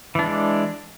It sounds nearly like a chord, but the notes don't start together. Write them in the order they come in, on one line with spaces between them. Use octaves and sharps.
E3 D4 G#3